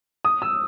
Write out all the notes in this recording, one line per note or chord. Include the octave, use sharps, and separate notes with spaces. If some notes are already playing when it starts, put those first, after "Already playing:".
D#6
E6